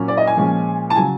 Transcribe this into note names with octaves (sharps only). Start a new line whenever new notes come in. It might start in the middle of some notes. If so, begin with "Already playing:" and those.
Already playing: A#2 F#3 A#3 C#4
D5
D#5
G#5
A#2 F3 G#3 C#4
A5
C#3 F#3 G#5